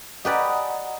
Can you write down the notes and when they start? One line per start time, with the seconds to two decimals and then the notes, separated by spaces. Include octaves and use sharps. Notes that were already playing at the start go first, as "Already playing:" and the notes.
0.25 G4 B4 D5 D#5 F#5 G#5 A#5 D#6